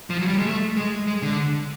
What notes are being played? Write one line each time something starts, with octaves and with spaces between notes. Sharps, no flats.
F3
F#3
G3
G#3
A3
G#3
G#3
D3